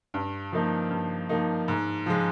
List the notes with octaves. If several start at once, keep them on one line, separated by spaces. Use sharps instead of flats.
G2
F3 A#3 D#4
G2
F3 A#3 D#4
G#2
F3 G#3